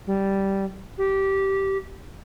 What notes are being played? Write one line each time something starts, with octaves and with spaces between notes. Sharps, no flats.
G3
G4